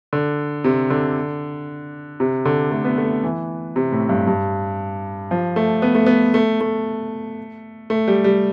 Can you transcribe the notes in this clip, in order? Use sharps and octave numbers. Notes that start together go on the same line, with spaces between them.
D3
C3
D3
C3
D3
A3
B3
A3
E3
C3
A2
G2
G2
F3
A3
B3
A3
B3
A3
A3
A3
G3
G3